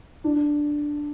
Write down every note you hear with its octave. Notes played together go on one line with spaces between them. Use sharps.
D4